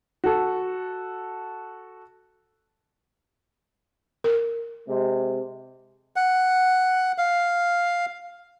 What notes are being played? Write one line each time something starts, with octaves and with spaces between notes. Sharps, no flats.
F#4 A4
A#4
C3 G#3
F#5
F5